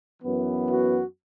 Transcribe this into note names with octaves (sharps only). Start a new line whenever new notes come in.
F#2 E3 B3
F#4